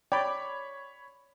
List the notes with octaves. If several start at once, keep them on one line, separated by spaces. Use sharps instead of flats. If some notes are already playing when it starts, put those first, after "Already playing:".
C#5 D5 G5 B5